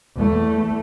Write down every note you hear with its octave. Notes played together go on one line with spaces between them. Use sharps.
E2 A3